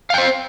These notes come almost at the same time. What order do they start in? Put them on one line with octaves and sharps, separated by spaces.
F5 G5 C5